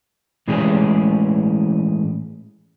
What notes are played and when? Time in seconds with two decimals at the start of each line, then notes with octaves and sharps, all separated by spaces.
0.48 A2 E3 G#3 C#4 G4 G#4